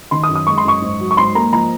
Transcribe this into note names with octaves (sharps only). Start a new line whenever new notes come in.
D#3 C6
D#6
F#2
D#6
G#3 C#6
C6
F#2 C#6
G#2
F#3
C#6
G#2 C6
A#3 A#5
F3 A#5